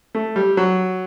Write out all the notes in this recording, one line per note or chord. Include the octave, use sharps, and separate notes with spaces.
A3
G3
F#3